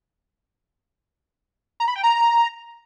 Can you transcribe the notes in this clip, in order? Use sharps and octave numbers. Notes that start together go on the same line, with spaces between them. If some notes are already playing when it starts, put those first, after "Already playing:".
A#5
B5
G5
A#5